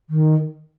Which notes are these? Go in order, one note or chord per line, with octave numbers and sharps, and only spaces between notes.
D#3